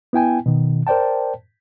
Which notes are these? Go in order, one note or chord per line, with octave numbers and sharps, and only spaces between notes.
B3 E4 G5 G#5
B2 D#3
A#4 C5 D5 G5 A5